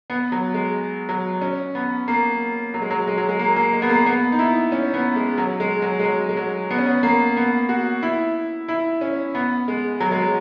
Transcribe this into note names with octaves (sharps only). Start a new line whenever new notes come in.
B3
F#3
G#3
F#3
C#4
B3
A#3
F#3
G#3
F#3
G#3
F#3
G#3
A#3
A#3
G#3
B3
A#3
B3
D#4
E4
C#4
B3
G#3
F#3
G#3
F#3
G#3
F#3
G#3
F#3
B3
C#4
B3
A#3
B3
F#4
E4
E4
C#4
B3
G#3
F#3
G#3
F#3